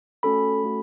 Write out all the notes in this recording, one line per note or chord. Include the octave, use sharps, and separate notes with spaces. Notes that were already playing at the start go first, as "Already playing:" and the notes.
A3 C#4 F#4 A4 B5
A3 C#4 F#4 A4